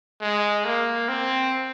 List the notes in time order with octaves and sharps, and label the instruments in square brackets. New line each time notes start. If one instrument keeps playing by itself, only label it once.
[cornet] G#3
A#3
C4